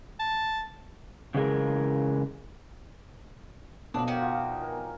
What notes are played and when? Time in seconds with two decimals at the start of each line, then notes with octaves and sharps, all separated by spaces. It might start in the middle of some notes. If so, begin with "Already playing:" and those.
0.19 A5
1.34 C#3 E3 G#3 E4 G#4 A#4
3.94 B2 D3 F3 F#3 D4 B4
4.07 D#4 F#4 G4 A#4 C#5 F5
4.20 F4
4.61 A#4 G#5 A#5